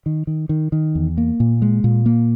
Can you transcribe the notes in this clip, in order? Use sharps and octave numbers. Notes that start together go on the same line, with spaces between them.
D#3
D#3
D#3
D#3
E2
A#3
A#2
G#3
A#2
A#3